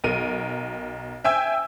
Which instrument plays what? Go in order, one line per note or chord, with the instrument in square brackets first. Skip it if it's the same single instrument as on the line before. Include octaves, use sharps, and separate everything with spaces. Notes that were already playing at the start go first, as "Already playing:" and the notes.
[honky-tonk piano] B1 A#4 D#7
E5 G5 G#5 E6